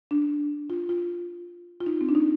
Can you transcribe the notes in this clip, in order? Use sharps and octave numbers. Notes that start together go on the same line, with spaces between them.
D4
F4
F4
F4
D#4
C4
D4
D#4